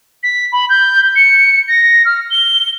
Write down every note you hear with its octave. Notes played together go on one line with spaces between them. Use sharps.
B6
B5
G6
C#7
A#6
F6
G7